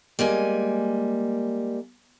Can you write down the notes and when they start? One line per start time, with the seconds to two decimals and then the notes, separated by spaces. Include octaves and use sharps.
0.19 G3 G#3 A#3 G#5